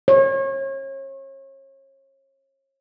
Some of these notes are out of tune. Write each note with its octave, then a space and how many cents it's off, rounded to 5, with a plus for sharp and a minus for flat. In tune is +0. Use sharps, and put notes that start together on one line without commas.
C#5 -35